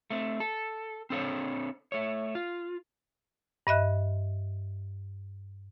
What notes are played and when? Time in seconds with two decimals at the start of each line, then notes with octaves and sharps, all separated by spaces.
0.10 A3 C4
0.40 A4
1.10 C4 D4 A4 C5 C#5
1.92 A3 C#5
2.35 F4
3.67 G2 D#5 E5 F#6